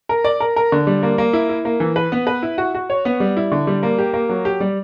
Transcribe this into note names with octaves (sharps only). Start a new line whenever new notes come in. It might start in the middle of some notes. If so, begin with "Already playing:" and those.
A#4
D5
A#4
A#4
D3
G3
A#3
A#3
E4
E4
A#3
E3
B4
B3
B4
E4
F#4
F#4
C#5
B3
G3
E4
D3
G3
A#3
G4
A#3
F#3
G4
G3